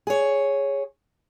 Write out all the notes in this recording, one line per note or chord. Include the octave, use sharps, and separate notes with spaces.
G#4 C#5